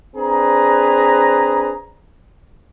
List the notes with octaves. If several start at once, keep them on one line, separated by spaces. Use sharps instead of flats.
C4 D4 G#4 B4 A#5